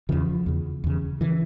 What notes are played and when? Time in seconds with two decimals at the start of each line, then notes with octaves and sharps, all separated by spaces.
0.09 E2 C#3 F3
0.46 E2 C#3
0.84 E2 C#3
1.21 C#3 E3